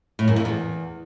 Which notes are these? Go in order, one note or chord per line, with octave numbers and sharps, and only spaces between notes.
A2
F#2
F2
E2